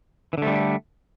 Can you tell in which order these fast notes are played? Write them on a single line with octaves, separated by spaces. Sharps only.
E3 D3 A3 G3